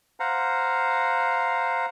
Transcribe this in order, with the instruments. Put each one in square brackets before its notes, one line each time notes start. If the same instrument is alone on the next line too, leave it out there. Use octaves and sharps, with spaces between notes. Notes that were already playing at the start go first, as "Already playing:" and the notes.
[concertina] C5 F5 F#5 A#5